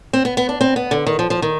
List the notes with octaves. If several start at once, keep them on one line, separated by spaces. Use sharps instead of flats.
C4
B3
B3
D4
C4
B3
D3
D#3
F3
F3
D#3